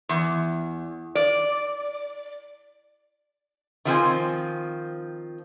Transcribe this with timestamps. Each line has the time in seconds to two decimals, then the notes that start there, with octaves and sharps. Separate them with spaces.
0.09 E2
1.15 D5
3.85 D#3 F3 C4 G#5